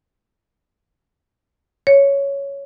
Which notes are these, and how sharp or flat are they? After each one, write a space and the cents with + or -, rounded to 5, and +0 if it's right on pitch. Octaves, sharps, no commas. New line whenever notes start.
C#5 +5